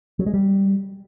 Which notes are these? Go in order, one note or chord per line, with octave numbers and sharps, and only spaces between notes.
F#3
G#3
G3